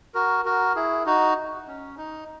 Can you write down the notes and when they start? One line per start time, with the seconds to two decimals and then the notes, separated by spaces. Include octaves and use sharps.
0.14 F#4 A#4
0.45 F#4 A#4
0.75 E4 G#4
1.06 D#4 F#4
1.68 C#4
1.97 D#4